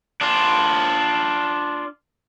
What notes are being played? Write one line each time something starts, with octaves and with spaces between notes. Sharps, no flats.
D4 F4